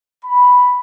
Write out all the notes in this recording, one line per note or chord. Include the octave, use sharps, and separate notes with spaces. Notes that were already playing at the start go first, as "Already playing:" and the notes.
B5